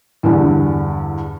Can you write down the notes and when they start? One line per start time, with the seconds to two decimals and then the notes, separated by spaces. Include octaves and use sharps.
0.23 E2 G2 D3